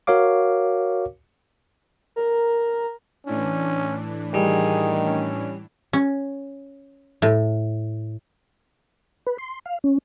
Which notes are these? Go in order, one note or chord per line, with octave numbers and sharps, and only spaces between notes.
F#4 A#4 C#5 F5 D6
A#4
A2 E3 C#4 D4
D#3 G3 G#4
C#4
C#4
A2
B4
C6
F5
C#4